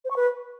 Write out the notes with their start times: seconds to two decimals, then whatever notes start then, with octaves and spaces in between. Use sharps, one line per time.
0.05 C5
0.11 C#6
0.16 B4